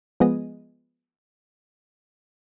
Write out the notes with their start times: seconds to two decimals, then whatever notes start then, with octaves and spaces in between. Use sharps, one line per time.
0.20 F3 G#3 B3 G#4 D#5